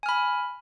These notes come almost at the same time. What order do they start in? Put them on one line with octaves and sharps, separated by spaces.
G#5 F6 B5